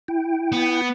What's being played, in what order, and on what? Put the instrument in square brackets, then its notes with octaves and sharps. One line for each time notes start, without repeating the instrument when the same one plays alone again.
[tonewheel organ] E4 G5
[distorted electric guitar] B3